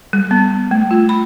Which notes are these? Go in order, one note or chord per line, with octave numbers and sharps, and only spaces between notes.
G3
B3
A3
F4
B5